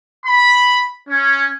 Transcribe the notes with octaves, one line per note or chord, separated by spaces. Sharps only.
B5
C#4